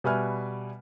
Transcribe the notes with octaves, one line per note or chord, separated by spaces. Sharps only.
B2 G3 B4 E5 G#5 F6